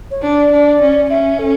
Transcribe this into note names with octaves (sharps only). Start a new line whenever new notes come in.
C#5
D4 D5
D4
C#4
C#4 E5
A4